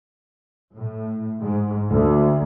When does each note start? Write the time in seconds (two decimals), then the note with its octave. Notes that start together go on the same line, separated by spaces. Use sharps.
0.75 A2
1.40 G#2
1.89 D2